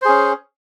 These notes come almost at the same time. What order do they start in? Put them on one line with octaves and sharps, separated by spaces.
C5 G#4 C#4